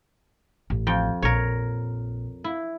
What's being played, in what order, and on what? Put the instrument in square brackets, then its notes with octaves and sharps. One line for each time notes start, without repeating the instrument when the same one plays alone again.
[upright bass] A1
[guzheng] F2 G5
[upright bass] A#1 [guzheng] A#4 C#5
[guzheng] E4